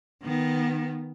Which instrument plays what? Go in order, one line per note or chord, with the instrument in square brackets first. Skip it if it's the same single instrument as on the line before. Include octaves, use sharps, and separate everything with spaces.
[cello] D#3 B3